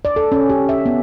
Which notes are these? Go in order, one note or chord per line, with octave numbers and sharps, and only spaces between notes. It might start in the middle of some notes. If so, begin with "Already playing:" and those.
D5
A4
C#4
G4
E5
B3